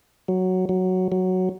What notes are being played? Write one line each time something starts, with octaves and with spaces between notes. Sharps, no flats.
F#3
F#3
F#3